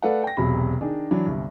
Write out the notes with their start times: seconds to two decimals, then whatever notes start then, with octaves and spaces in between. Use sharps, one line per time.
0.02 A3 A4 B4 D5 F5 F#5
0.23 G5 A#6
0.37 E1 B1 C3 B5
0.81 D#3 D4 G#4
1.11 E3 F#3 D4
1.26 G1 C2 G2